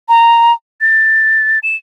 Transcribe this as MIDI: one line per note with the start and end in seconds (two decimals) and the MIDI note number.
0.09 0.52 82
0.81 1.59 93
1.63 1.76 100